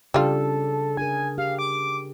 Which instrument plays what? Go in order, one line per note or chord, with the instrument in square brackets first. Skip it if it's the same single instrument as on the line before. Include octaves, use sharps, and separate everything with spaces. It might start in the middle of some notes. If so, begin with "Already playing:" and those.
[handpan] C#3 D4 [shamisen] G3 F4 [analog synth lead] A4
[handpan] D4 G#4 A#4 [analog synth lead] G#5
[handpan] G4 [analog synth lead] F5
[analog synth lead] D6